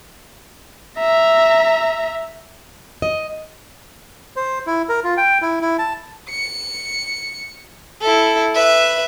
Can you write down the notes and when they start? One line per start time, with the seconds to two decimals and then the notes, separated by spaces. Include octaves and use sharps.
0.99 E5 A#5
3.02 D#5
4.36 C5
4.67 E4
4.89 A#4
5.04 F4
5.17 G5
5.42 E4
5.62 E4
5.79 A5
6.29 C#7
8.01 E4 A4
8.55 B4 E5